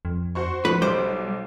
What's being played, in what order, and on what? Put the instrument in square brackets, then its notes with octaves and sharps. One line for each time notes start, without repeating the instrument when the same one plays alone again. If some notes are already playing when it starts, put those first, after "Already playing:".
[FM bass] F2
[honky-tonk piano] F#4 C5 C#6
[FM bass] F3 [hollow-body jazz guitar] B4
[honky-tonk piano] B1 D6 D7 [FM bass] G3 [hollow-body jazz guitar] C5